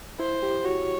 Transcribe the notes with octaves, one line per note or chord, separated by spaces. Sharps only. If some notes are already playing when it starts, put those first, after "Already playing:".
E4 C5
G4
F#4 C#5